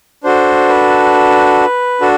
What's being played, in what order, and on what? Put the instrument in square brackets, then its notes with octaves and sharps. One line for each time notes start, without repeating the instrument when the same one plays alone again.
[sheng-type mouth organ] D4 F#4 A4 C5
B4
D4 F#4 A4